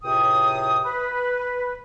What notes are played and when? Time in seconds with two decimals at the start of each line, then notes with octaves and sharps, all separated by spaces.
0.04 C#2 A2 C3 G5 D#6
0.85 B4